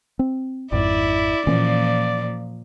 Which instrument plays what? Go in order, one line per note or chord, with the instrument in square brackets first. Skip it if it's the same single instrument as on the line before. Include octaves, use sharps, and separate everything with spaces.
[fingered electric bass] C4
[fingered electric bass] G#1 F2 G#2 [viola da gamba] E4 [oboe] D5
[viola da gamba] A#2 F3 [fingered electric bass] E3 A#3 C#4